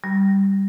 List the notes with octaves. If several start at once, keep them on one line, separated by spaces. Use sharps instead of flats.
G3